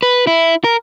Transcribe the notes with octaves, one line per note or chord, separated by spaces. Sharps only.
B4
E4
A#4